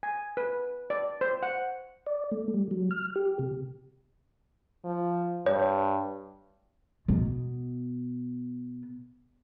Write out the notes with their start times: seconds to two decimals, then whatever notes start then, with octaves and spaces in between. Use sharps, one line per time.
0.03 G#5
0.37 B4
0.90 D5
1.21 C5
1.43 F#5
2.07 D5
2.31 A3
2.54 G3
2.71 F#3
2.91 F6
3.16 G4
3.39 C3
4.85 F3
5.46 G2 C#5
7.08 B2 B3